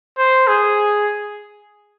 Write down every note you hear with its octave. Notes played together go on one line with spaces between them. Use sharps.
C5
G#4